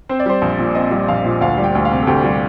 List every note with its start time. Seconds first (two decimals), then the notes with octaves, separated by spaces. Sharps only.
0.09 C4 C5
0.20 D5
0.26 G3 C5
0.42 A#1
0.59 A#2
0.75 C4 D#5
0.91 G3
1.08 A#1 F5
1.25 A#2
1.41 D2 F5
1.57 G3
1.64 G5
1.75 D2
1.85 F5
1.91 C3
2.02 A4
2.07 D2 G4
2.24 G3